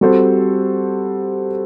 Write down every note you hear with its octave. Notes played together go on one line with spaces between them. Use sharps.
G3 C4 F#4 A4 C5